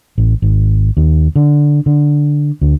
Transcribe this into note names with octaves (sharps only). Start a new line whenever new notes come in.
A1
G#1
D#2
D3
D3
D2